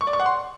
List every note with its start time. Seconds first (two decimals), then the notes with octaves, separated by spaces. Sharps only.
0.01 C#6
0.07 D5
0.13 C#6
0.20 F#5
0.26 C6